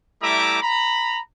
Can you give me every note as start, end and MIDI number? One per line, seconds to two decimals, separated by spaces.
0.22 0.59 55
0.22 0.59 57
0.22 0.59 64
0.22 0.59 76
0.22 0.59 82
0.22 0.59 86
0.62 1.19 82
0.62 1.19 83